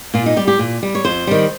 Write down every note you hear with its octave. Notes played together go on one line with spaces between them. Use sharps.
A#2 F4
D#4
G3 G4
G4
A#2
G3
C#5
F2 C5
D#3 G3